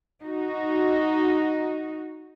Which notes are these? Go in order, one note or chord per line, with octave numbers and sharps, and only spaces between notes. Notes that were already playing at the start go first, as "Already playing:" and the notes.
D#4 F#4